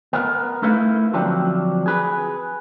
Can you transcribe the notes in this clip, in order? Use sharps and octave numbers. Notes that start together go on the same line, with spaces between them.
B3 A#4
A3 D#4 E4 A4 B4 F5
D3 F3 F#3 C4 D4 G4
G#4 B4